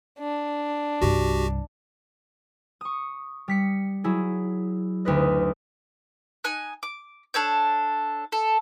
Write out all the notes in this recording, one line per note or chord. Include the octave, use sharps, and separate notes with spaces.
D4
C2 G2 F#4 G4
C#6 D#6
G3 B6 C#7
F#3 E4 G#4
F#1 D2 D#4 B4 D#5
D#4 G#5 F#6
D6
D4 A4 C#5 G6
A4